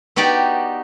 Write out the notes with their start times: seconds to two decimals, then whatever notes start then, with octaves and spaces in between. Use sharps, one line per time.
0.16 B3 D#4 F#4 G4 D5